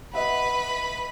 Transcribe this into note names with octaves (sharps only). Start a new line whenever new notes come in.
B4 D#5 E5 F#5 B5